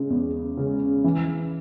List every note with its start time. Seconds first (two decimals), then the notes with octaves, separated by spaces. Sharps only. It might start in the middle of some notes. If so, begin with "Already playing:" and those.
Already playing: C#3 G#3
0.10 E2
0.57 C#3 G#3
1.04 E3